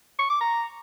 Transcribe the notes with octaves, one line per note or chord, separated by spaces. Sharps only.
C#6
D6
A#5